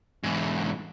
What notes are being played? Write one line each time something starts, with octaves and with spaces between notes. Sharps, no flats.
E2 G#2